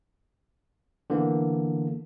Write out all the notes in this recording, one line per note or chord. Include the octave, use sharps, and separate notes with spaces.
D3 E3 A#3 B3